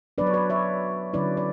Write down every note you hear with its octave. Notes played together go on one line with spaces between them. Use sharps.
F#3 B3 D4 B4 D5
C#5
B4 D5
C#5 E5
D3 F#3 C#4 E4 B4 D5
D5